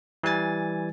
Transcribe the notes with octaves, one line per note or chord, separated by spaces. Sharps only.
E3 G3 G#5 A6